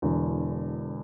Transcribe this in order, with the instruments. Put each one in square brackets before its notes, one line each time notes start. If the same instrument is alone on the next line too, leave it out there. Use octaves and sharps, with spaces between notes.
[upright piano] E1 E2 D3